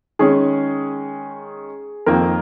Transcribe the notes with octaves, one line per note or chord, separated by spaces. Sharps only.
D#3 G#3 C#4 G#4
F2 D#3 A#3 A#4